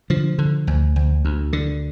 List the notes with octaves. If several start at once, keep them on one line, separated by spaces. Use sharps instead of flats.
D3 F3
D3
D2
D2
D2
D3